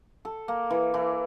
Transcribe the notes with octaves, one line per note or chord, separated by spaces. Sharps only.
A4
A#3
E3
E3